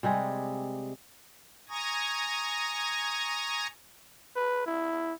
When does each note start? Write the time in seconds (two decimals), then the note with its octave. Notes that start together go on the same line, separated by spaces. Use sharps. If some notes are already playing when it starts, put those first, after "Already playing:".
0.03 C3 G3 G#3 G#4
1.69 G#5 A#5 C#6 D#6 G#6 A#6
4.36 B4
4.66 E4